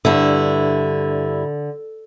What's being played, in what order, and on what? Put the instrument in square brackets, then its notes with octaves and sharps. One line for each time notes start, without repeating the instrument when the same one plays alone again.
[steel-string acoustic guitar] G2 E4 [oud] D3